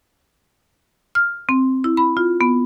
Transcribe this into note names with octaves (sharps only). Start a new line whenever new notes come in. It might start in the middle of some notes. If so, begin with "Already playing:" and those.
F6
C4
E4
B5
F4
B3